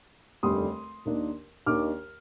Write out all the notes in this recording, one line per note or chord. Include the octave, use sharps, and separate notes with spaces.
F1 D#2 D3 G3 C6 D#6
D#2 D#3 A#3 D4
D#2 D#3 A#3 D4 D6 F6